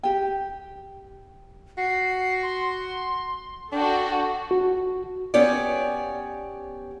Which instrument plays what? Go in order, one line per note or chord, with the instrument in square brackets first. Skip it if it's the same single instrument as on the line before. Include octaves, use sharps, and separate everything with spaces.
[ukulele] G4 G5
[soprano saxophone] F#4 [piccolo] C7
[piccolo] C6
[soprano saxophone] D4 [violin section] F#4 A4 [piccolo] G5
[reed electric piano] F#4
[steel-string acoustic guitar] B3 C#4 G4 C#5 D5